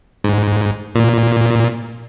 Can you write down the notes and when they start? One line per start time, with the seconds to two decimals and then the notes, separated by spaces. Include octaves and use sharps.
0.24 G#2
0.95 A#2